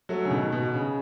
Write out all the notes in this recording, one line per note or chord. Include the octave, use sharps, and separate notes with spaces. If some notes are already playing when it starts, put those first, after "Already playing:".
F#3 A3
C#3
B2 D#3
B2
C#3